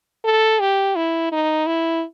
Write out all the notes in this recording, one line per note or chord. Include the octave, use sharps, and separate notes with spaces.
A4
G4
E4
D#4
E4